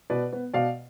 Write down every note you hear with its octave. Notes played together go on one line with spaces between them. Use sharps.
B2 B4 D5
B3
B2 D5 F5